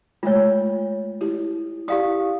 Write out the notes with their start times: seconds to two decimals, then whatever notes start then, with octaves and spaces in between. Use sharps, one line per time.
0.23 G#3 A3 F4 C#5
1.21 E4 G4
1.88 E4 G4 D5 F5 D#6